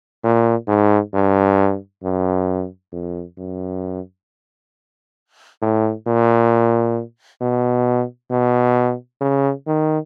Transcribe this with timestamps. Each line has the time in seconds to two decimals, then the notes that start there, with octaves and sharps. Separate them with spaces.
0.24 A#2
0.68 G#2
1.14 G2
2.04 F#2
2.92 F2
3.38 F#2
5.62 A2
6.07 A#2
7.41 B2
8.31 B2
9.21 C#3
9.67 D#3